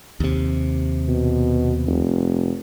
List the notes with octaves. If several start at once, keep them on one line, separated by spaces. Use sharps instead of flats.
D#2 C3
B2
F1